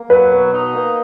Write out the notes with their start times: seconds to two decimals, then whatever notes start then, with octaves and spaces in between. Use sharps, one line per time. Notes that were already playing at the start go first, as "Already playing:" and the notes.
Already playing: A#3
0.10 F#3 B4
0.32 B2
0.54 D#4
0.74 A#3